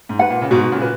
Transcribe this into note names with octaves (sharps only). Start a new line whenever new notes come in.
G#2
B4 F#5
A#2
C#3
G#2 B2 F#4
A#2 C#3
B4